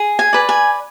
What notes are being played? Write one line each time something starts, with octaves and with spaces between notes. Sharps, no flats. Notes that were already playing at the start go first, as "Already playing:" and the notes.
Already playing: G#4
G#5
B4 D5
G#5